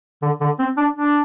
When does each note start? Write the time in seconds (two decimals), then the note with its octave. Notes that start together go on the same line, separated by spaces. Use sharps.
0.22 D3
0.41 D3
0.59 C4
0.77 D4
0.97 D4